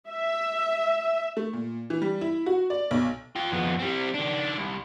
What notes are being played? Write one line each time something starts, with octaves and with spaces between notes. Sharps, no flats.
E5
A3
A#2
E3
G3
E4
F#4
D5
B1
F4 G5
F2 B3
G3 C4
D#3 D4
C2